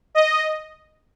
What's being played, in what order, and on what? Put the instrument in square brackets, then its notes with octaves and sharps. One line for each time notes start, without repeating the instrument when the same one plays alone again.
[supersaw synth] D#5